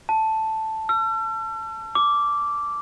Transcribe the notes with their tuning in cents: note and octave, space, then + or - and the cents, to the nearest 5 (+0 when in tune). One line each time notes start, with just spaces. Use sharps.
A5 +0
E6 +45
D6 -10